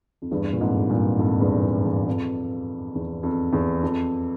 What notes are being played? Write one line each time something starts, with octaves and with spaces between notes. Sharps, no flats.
F2
E2 G2
A#2
F2 G#2
G2 A#2
F2 G#2
E2 G2
F2
E2
F2
E2
F2
E2
F2